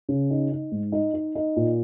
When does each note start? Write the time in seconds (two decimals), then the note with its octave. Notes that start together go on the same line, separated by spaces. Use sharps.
0.09 C#3
0.30 D#4
0.51 D#4
0.72 G#2
0.92 D#4
1.14 D#4
1.35 D#4
1.56 A#2